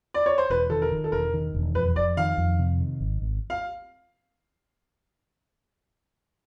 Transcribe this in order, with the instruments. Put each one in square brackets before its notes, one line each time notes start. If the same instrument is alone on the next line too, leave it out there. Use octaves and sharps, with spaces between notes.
[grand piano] D5
C#5
C5
[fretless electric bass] E1 [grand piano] B4
[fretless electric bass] D#3 [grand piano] A4
[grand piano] A#4
[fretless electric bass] D#3
[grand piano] A4
[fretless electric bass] E1 [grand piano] A#4
[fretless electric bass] D#3
E1
[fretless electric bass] F2 [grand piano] B4
[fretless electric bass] F2 [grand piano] D5
[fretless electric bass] D#3 [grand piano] F5
[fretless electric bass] F2
C3
D#3
G#1
G#1
[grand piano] F5